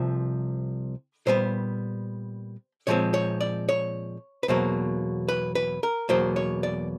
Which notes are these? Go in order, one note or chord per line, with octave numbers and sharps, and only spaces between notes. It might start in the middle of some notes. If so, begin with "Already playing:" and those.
Already playing: C2 C3 F3
A#2 G3 B3 C5
A#2 F3 G#3 C4 C#5
C#5
D5
C#5
B4
E2 B2 F#3 A#3 C5
B4
B4
A#4
E2 B2 F#3 A#3 C5
C#5
D5